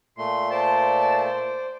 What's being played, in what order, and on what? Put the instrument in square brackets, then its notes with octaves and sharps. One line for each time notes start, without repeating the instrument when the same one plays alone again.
[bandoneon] A#2 A3 [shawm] C6
[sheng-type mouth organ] C5 D5 [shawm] A5